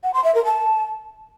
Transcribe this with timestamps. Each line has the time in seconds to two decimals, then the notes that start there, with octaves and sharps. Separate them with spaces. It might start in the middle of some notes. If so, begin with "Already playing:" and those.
0.03 F#5
0.14 C6
0.24 E5
0.35 A#4
0.45 A5